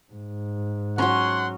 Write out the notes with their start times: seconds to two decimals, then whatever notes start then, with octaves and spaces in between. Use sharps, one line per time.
0.12 G#2
0.98 F#3 C#4 F#5 C6